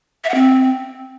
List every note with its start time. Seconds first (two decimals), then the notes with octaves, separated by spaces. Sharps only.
0.24 E5
0.29 F#5
0.34 C4